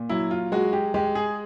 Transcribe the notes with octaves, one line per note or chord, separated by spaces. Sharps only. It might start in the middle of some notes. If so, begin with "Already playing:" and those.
Already playing: A#2
F#3 E4
F4
G#3 F#4
G4
G#3 G4
G#4